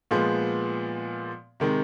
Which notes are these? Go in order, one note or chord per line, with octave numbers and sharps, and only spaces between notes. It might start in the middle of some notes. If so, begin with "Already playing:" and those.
A#2 F3 G#3 B3
C3 D#3 G#3